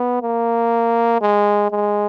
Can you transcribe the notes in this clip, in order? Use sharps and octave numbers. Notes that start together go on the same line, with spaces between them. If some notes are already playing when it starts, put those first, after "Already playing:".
Already playing: B3
A#3
G#3
G#3